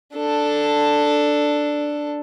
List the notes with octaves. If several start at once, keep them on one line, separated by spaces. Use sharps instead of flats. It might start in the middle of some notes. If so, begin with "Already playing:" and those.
D4 A4